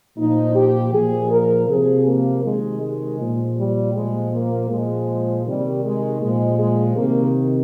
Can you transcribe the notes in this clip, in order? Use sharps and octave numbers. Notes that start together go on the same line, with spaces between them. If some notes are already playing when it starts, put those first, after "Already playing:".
A#2 F3 D#4
G4
A#2 F3 G#4
A#4
C3 F3 G#4
A#3
C3 D#3 G#3
G#3
A#2 F3
G3
A#2 F3 G#3
A#3
A#2 F3 G#3
C3 D#3 G3
G#3
A#2 F3 G#3
G#3
C3 D#3 A#3